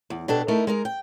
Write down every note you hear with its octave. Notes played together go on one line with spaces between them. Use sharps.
E2
B2 D4 G4 A4
A3 D#4 E4 A4 A#4
G#3 D#4 A#4
G5